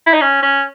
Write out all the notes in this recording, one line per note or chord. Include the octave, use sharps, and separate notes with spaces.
E4
D#4
C#4
C#4